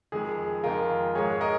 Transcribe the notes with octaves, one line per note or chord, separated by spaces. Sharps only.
F2 D#3 G#3 G#4
F2 D#3 G#3 F4 A#4
G#2 G#3 G#4 C#5
A#4 D#5